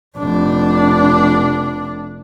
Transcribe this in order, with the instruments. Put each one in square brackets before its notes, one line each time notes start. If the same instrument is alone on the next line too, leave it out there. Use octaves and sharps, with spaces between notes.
[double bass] F1 D4